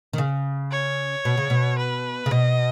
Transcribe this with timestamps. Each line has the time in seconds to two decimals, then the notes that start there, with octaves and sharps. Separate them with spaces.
0.13 D#3
0.18 C#3
0.72 C#5
1.25 B2
1.37 C#3
1.50 B2
1.78 B4
2.26 C#3
2.31 B2 D#5